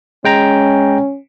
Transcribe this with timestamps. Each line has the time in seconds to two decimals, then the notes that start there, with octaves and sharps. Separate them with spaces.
0.24 G#3 C#4 G5 A#5